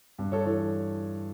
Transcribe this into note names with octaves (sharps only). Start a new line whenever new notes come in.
G2
A4 C#5
E3 A4 C#5